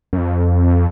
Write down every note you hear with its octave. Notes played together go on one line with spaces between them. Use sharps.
F#2
F2